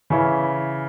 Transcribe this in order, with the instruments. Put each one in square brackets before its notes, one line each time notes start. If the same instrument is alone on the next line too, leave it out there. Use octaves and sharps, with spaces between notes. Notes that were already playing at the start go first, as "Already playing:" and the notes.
[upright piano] C#3 E3 C#4 E4